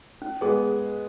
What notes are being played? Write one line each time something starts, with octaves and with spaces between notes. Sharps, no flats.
C#4
G#3 B3 G#4